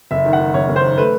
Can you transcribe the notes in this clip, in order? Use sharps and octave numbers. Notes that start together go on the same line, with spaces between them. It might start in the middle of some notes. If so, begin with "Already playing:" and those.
F#1 E5
D#3
F#5
D#3
F#1 C#5
F#1
C5
D#3
A3 B4